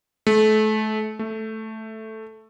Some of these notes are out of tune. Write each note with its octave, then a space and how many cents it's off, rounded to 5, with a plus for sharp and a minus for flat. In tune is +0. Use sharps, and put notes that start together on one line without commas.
A3 -30
A3 +0